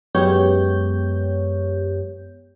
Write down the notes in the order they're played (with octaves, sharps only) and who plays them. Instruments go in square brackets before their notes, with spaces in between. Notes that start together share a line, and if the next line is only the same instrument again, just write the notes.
[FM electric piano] F#2 G#3 B3 G4 C#5 G6